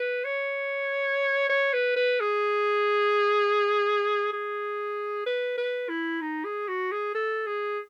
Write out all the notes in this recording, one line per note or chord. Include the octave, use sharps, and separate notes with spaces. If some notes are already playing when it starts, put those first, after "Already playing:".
Already playing: B4
C#5
C#5
B4
B4
G#4
G#4
B4
B4
E4
D#4
G#4
F#4
G#4
A4
G#4